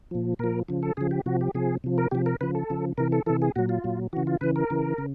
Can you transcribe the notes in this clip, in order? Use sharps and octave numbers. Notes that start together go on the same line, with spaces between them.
A#2 F3
A#2 F3 A#4
C#3 F3
A4
C#3 F3 G#4
G4
C3 F3 F#4
G4
C3 F3 G#4
C3 F3
A#4
C3 F3 G4
A#4
C#3 F3 B4
A4
C#3 F3
C3 E3 A#4
A4
C3 E3 A4
G#4
A#2 F#3 F#4
F4
A#2 F#3
C#3 E3 F#4
F4
C#3 E3 B4
A#4
C#3 E3
C#3